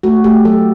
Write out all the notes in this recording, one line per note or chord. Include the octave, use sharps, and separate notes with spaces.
A3 F#4
A3 G4
F#3 A4